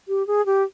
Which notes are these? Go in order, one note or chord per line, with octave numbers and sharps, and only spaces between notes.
G4
G#4
G4